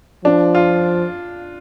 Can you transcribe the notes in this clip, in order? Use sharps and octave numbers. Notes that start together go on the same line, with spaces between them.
F3 D4
F4